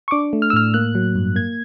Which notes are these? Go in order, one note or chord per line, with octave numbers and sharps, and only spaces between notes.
C#6
D4 D6
A3
F6
E6
A2 F6
A#3 F#6
F#3
G2
A#3 G#6